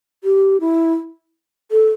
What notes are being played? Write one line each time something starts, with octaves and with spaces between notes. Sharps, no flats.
G4
E4
A4